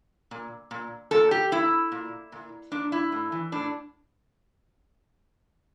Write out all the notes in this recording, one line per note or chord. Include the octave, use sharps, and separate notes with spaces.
A#2
A#2
A#2 A4
G4
A#2 E4
A#2
A#2
A#2 D4
E4
A2
E3
A2 D4